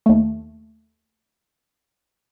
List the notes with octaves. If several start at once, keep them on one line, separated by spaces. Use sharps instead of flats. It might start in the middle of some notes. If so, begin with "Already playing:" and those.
D#2 A3